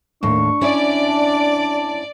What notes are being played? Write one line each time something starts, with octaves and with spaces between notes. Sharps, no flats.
D#2 A2 D4 C#6
C#4 E4 D5
A5